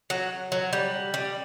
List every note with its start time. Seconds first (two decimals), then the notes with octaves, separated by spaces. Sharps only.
0.10 F#3
0.52 F#3
0.73 G3
1.14 G3